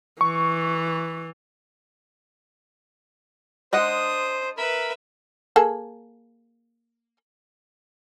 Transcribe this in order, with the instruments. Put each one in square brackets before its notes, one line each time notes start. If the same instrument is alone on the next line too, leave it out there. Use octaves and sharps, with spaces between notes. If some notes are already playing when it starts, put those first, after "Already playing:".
[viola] E3 [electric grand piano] C#6
[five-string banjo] G#3 D#5 F#5 [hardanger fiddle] D4 D#6 [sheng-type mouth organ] C5
[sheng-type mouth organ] A#4 B5 [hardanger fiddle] B4 E5
[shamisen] A#3 G#4 A4